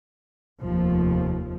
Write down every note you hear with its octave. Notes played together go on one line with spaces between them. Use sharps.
F1 D#2 F3